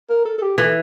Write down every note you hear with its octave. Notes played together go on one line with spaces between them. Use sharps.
A#4
A4
A4
G4
E3 A4